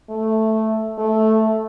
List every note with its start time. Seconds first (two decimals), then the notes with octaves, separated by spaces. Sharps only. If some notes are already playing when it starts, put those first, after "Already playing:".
0.10 A3
0.98 A3